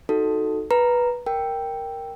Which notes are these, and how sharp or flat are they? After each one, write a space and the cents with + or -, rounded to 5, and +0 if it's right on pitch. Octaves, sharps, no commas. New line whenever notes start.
D#4 +0 F#4 +0 A4 +0
B4 -15 A#5 +0
A#4 +0 G5 +0